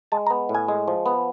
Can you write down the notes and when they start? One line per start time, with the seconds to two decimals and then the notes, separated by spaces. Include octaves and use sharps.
0.12 G#3 A5
0.27 A#5
0.30 B3
0.49 A2
0.55 G#5
0.68 G#3
0.88 F3
1.06 B3